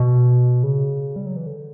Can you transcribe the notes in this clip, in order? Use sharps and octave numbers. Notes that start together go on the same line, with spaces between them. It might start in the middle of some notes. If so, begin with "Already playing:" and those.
Already playing: B2
C#3
G3
F#3
E3
D3